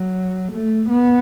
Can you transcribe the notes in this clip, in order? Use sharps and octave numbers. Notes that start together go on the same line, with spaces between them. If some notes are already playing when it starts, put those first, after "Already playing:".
Already playing: F#3
A3
B3